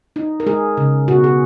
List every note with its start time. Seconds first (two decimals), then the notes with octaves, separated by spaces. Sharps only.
0.16 D#4
0.40 A#4
0.47 G#3 G#4
0.77 C#3
1.08 B2 F#4
1.24 G#4